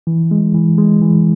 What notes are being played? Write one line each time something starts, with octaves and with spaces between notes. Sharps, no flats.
E3
G#3
E3
G#3
E3